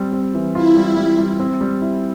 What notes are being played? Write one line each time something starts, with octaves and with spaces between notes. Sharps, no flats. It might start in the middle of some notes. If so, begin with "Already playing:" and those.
Already playing: G3 C4
C4
E3
E4 F4
G3
G3
G3
C4
G3
E4